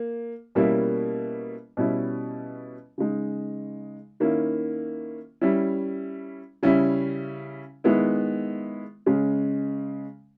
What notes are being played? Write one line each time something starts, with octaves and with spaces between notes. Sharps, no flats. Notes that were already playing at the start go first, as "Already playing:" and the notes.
Already playing: A#3
B2 G3 A#3 C#4 E4
B2 G3 C#4 E4
C#3 G#3 D#4
D#3 A#3 C#4 E4
G3 C#4 E4
C#3 G3 C#4 E4
D#3 G#3 B3 E4
C#3 G#3 C#4